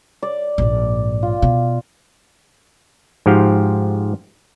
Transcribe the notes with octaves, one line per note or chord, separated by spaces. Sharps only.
D5
A#1 G#2
F4
B2
G#2 F3 F#4 G4 F5 G5